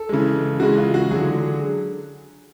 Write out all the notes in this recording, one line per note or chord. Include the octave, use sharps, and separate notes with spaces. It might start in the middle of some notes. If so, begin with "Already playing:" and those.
Already playing: A4
C#3 E3 G#3
C#3 E3 G#3 F#4
F4
F#4
D3 F#3 G#4